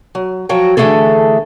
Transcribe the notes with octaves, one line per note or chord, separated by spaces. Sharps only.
F#3
F3 F#3 F#4 G5
D3 E3 A3 F4 G#4 A4